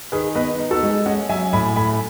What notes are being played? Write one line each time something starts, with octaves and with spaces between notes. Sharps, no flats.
D#3 G#4 B4
B3 B4 D#5
D#4
F#4 A4
G#3
C#4 D#5 F#5
F#3 E5 G#5
A2 G#5 B5
A3 G#5 B5